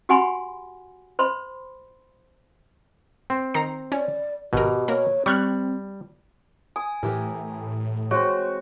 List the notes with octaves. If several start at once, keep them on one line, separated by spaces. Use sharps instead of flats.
F#4 G4 F#5 G#5 B5 C6
C5 B5 C6
C4
D#3 A#5 C7
C#4 D5
G#1 B2 G4 A#4
A#3 A#4 C#5
G3 C4 C#6 F6 F#6
G#5 D#6
A2 E3 G4 A#4
G#3 C4 F#4 C#5